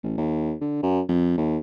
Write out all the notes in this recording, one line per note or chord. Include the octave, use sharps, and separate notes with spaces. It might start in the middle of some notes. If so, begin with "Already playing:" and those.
A1
D#2
D3
F#2
F2
D#2